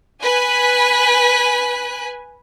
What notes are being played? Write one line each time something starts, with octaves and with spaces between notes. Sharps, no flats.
B4 G#5 F#6